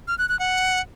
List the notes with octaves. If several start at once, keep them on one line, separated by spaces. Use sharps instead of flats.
F6
F#6
F#6
F#5